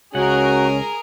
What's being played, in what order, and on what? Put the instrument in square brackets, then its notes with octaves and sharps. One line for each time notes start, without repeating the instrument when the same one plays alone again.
[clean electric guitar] C#2 F#5 [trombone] C#4 [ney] F#4 [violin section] G#4 A#4